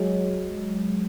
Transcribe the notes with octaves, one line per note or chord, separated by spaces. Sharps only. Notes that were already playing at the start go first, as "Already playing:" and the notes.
Already playing: F#3 G#3